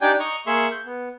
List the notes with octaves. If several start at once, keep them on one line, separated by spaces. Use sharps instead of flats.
D4 D#4 G4 D5 G5 G#5
D#5 A#5 C#6
A#3 G#4 E5 C6 C#6
G6
B3